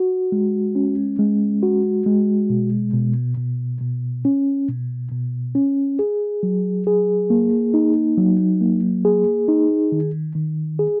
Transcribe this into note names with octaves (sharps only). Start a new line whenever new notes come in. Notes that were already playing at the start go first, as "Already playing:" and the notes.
Already playing: F#4
G#3
C#4
G#3
F#4
G#3
B2
B2
B2
B2
C#4
B2
B2
C#4
G#4
F#3
G#4
A#3
D#4
F#3
A#3
G#4
D#4
D#3
D#3
G#4